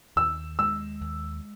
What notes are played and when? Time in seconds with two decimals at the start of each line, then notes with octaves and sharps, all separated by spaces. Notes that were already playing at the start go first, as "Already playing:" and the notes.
0.16 D#2 E6
0.59 G#3 E6
1.01 D#2